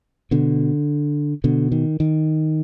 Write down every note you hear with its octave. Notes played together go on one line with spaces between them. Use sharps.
B2 D3
B2 D3
D#3
D#3